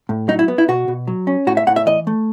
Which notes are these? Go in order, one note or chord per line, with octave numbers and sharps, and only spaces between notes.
A2
F#3 D#4
E4
B3
E4
B2 F#4
B2
F#3
C#4
A2 F#4
E5
A2 F#5
E5
E3 D#5
A3